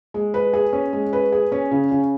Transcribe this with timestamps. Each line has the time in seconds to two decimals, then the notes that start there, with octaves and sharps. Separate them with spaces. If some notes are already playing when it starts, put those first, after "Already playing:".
0.14 G#3
0.34 B4
0.53 G#4
0.73 C#4
0.93 G#3
1.13 B4
1.32 G#4
1.52 C#4
1.71 C#3
1.91 C#3